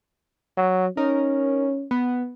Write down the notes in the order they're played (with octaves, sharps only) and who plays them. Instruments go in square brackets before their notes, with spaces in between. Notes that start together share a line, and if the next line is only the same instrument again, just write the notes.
[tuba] F#3
[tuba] C#4 [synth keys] D#4 A#4
[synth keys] B3